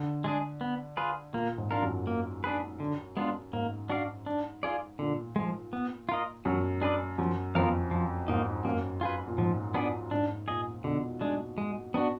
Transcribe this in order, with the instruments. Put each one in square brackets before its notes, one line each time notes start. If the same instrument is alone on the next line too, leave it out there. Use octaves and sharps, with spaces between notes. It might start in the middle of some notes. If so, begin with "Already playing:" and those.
Already playing: [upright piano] D3
[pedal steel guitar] G#3 D4 G#4
B3
F4 G#4 B4
[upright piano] A#2 [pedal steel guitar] A#3
[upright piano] G#2
[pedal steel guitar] D4 F4 A#4
[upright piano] F#2
[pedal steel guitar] A#3
D4 G#4 B4
D3
G#3 B3 D4 F4
[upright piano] G#2 [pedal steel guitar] A#3
[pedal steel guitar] D4 F#4 D5 F5
D4
F4 G#4 D5
[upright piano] A#2 [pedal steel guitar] D3
[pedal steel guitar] F3 G#3
B3
F4 A#4 D#5
[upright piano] F#2 [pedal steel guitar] F#3
[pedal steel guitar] D4 G#4 B4 D5
[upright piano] F#2 [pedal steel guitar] F3
[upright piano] F2 [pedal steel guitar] B3 F4 A#4 F5
[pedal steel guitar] F3
[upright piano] G#2 [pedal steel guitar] A#3 D#4
[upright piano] F#2 [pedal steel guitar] A#3
[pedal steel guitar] F4 G#4 B4
[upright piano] A#2
[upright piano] G#2 [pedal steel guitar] F3
[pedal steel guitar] B3 D4 G#4 D5
[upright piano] G#2 [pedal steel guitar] D4
[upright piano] A#2 [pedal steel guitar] G#4 D#5
[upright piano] B2 [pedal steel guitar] D3
[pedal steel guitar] G#3 D4
G#3
B3 D4 F#4